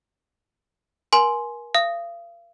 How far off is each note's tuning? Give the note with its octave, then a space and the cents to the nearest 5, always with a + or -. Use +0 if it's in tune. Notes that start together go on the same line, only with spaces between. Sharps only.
A#4 +35 G#5 +15 C6 +0
F5 -35 D#6 +0